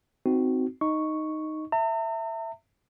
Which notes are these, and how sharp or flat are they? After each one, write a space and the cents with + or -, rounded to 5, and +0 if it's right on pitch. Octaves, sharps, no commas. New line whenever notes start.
C4 -20 D#4 +5 F#4 +0
D#4 +0 D#5 +0 C#6 +0
E5 +0 A#5 -45